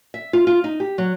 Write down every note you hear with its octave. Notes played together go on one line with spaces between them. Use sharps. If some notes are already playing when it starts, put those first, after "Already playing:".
E5
F4
F4
D#4
G4
F#3